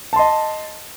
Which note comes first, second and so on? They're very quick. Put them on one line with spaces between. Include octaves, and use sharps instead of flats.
A5 C6 D#5